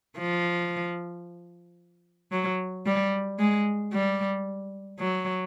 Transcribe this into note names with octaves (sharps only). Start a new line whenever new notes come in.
F3
F#3
G3
G#3
G3
F#3